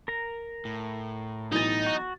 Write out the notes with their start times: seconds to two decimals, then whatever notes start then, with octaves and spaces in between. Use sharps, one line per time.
0.08 A#4 A#5
0.65 A2
1.52 B1 E3 D#4 A6
1.86 F#4